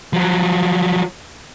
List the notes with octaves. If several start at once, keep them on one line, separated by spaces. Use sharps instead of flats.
F3 F#3